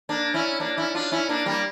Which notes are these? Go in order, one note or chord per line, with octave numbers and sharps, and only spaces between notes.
A#3 D4
C#4 E4
A#3 D4
C#4 E4
D4 F4
C#4 E4
A#3 D4
G3 A#3